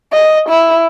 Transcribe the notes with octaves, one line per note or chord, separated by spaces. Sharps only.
D#5
E4